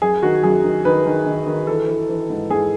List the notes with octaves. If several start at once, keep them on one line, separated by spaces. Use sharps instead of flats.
F#2 G#4
D#3 F#4
F#2 G#4
D#3
D#3 B4
D#3
D#3
D#3
E3 A4
E3
E3
G#2
G#2 G#4